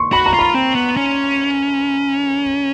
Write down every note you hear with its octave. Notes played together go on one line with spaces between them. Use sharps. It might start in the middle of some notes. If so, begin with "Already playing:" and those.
Already playing: C6 C#6
F#4 B5
A#5
F4 B5
C4
B3
C#4